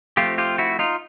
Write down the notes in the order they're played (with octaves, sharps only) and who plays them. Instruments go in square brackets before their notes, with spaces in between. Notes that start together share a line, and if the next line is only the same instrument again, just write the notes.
[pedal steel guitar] F3 A3 C4 F4 G4
F4 G4
E4 F#4
D#4 F4